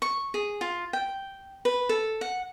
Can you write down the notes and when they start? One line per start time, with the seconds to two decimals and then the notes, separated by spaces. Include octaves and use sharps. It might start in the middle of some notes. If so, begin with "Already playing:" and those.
0.02 C#6
0.34 G#4
0.61 F4
0.93 G5
1.65 B4
1.89 A4
2.21 F#5